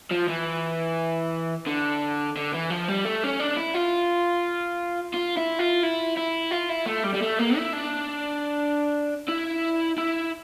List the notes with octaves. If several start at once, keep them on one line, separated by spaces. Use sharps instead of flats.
F3
E3
D3
D3
E3
F3
G3
A3
C#4
D4
E4
F4
F4
E4
F4
E4
E4
F4
E4
A3
G3
G3
A3
A#3
E4
D4
E4
E4